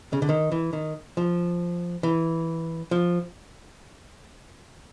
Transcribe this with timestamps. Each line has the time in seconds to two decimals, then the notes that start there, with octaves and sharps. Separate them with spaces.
0.13 C#3
0.22 D3
0.29 D#3
0.52 E3
0.73 D#3
1.17 F3
2.03 E3
2.91 F3